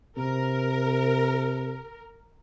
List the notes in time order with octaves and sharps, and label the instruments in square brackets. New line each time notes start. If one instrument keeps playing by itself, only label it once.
[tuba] C3 [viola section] A#4